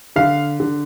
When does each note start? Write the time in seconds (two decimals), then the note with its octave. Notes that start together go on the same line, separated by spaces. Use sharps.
0.16 D3 F5
0.60 D3